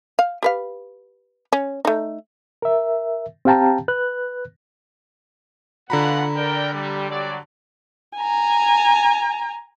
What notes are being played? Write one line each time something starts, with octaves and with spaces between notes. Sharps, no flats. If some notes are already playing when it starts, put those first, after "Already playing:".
F5
G4 B4 F5
C#4
A3 D#4
A#4 E5
C4 G4 F5 G5 A5 A#5
B4 F#6
B2 D3 F4 F#5 A#5 B5
A#4 D5 G5
G3
F#3 G3 D5
G#5 A#5